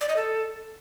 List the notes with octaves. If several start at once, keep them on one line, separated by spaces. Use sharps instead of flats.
D5
D#5
A4